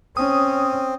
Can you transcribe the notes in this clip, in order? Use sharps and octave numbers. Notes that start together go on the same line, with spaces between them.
C4 C#4 D#6